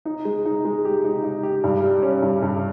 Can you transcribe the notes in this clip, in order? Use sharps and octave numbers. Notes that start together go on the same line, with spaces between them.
D#4
G#3
D#4
G#3
G4
D#4
D#4
G4
G2
G3
C#4
G2
G2